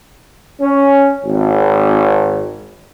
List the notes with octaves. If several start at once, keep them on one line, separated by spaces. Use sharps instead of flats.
C#4
G#1